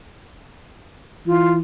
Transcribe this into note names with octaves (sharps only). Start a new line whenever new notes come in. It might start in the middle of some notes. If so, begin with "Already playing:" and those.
E3 F4